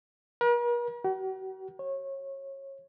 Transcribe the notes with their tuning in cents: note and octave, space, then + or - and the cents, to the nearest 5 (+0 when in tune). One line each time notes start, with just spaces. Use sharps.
A#4 +45
F#4 +45
C#5 -25